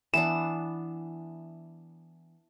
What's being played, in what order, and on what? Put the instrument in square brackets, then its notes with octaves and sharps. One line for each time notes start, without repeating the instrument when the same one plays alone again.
[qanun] E3 B3 D4 [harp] E7